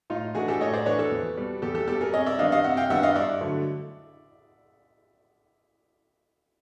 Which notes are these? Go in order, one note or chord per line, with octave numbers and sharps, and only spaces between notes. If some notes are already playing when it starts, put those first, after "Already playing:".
A2 D#4 F4
E3 A3 D4 F#4 G#4
G4 A4
A2 C#5 D#5
C5 D5
E3 A3 D4 B4 C#5
A4 B4
E2
B2 G3
E2 G4 A4
G4 A4
B2 G3 G4 A4
G#4 A#4
C3 C#5 D#5
D5 E5
D#3 G3 B3 D4 D#5 F5
D#5 F5
C3 E5 F#5
F5 G5
D#3 G3 B3 D4 E5 F#5
D#5 F5
G2 D5 E5
D3 F#3 A3